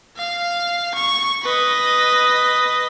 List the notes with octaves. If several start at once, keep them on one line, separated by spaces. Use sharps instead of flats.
F5
C#6
B4 D#5